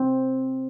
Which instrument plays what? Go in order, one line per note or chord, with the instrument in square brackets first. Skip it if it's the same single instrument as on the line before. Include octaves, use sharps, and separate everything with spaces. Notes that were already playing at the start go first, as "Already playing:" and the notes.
Already playing: [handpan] C4